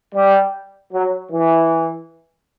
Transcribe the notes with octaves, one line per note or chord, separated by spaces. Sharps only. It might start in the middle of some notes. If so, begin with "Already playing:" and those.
G3
F#3
E3